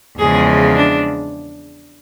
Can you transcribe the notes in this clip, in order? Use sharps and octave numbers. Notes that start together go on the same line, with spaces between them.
E2 C#3 F3 G#3 G#4
D4